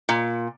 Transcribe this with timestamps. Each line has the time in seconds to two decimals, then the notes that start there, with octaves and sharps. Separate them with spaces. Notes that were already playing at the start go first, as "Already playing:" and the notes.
0.09 A#2